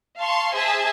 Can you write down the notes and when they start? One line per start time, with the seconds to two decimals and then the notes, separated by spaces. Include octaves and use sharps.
0.18 F5 A5 C6 C#6
0.54 G#4 C5 E5 A5